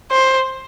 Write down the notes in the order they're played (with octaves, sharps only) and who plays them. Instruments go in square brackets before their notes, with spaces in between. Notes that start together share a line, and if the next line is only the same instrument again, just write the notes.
[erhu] C5